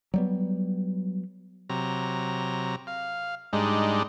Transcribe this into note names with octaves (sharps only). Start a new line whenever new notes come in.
F#3 G3 B3
C3 F#3 A#5
F5
G#2 G3 G#3 D4 D#4